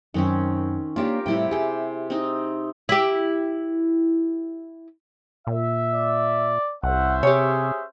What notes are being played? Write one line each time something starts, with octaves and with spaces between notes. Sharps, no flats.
F#2 D#3 C4 C#4
A#3 D4 F4 G4 A#4 C#5
A2 C3 G3 E4 G5
G4 G#4 C5
C4 D#4
E4 G4
A#2 E5
D5
C2 C#4 C5 E5 F#5
C3 G4 G#4 C#5